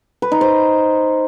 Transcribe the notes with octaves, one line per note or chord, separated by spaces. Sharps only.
B4
D#4
C5